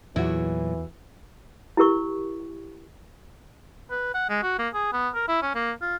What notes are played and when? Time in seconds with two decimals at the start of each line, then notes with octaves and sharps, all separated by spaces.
0.16 E2 A#2 E3 F#3 E4 F#4
1.77 E4 G4 A#4 C#6
3.91 B4
4.15 F#5
4.30 G#3
4.43 F#4
4.59 A#3
4.74 G#4
4.93 B3
5.15 A#4
5.28 E4
5.42 C#4
5.55 A#3
5.82 F4